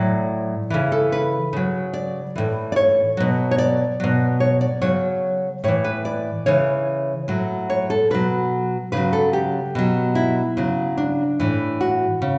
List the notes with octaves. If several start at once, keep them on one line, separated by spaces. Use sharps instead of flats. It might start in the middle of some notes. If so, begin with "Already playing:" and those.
Already playing: A2 F#3 D5
C#3 E3
A4
B4
C#3 F#3
D5
A2 E3
D5
C#5
B2 F#3
C#5
D5
B2 F#3
C#5
D5
C#3 F#3 C#5
A2 E3 C#5
B4
D5
C#3 E3 C#5
A2 F#3
C#5
A4
B2 F#3 B4
C#3 F#3 B4
A4
G4
B2 F#3
E4
C#3 F#3
D4
A2 E3
F#4
C#3